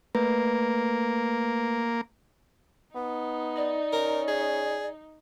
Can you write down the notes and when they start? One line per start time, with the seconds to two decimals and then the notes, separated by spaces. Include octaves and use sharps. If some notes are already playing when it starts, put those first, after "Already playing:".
0.15 A3 A#3 B4
2.95 B3 D#4
3.55 D5
3.93 C#4 A#4
4.28 G#4